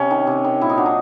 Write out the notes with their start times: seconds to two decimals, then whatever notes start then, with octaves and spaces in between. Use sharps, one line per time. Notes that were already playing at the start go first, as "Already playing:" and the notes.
Already playing: C3 C#4
0.11 D#3
0.27 C3
0.44 D#3
0.61 A#2 E4
0.70 D#4
0.78 F#3 D4
0.86 D#4